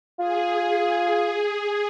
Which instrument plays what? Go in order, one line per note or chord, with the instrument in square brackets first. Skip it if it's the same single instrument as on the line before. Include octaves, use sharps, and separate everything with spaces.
[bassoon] F4 [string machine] G#4